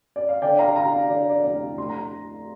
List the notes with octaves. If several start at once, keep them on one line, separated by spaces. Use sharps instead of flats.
D5
F5
D3 D5 G5
F5 A#5
D3 F5 A#5
F5
D3 D5
D5
F1 F5
D2 C6
A#5